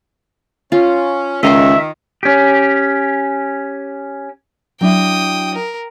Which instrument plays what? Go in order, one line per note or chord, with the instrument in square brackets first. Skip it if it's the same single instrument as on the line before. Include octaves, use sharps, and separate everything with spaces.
[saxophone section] C#4 [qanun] F4
[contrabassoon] C#2 [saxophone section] D#3 [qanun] D#5 A#5 C6 [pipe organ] E5
[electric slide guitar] C#4 G4
[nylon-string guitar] F#3 D4 E4 [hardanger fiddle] G5 D#6
[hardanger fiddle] A#4